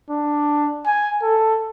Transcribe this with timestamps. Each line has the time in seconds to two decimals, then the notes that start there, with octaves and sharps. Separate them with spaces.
0.10 D4
0.86 G#5
1.23 A4